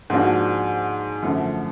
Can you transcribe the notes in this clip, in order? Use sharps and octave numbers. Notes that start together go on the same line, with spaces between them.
G#2 F3 A#3 D4 F#4
F#2 D3 F3 A3